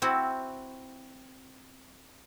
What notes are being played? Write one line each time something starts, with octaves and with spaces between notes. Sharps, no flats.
C4 E4 F#4